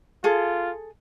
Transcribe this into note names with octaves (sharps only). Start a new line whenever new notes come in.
F4 G#4 A4